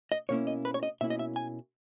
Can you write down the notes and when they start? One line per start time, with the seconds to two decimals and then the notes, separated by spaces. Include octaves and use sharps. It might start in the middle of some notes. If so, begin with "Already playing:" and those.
0.12 D#5
0.29 B2 A#3 C#4 E4 C#5
0.47 D#5
0.65 B4
0.74 C#5
0.83 D#5
1.01 B2 A#3 C#4 E4 E5
1.10 D#5
1.19 E5
1.36 G#5